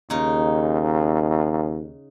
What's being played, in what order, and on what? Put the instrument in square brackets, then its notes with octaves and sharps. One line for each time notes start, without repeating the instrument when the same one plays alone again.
[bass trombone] D#2 [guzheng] C#3 D#4